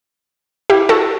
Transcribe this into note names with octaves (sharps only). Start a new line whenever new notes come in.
E4 G4
F#4 A4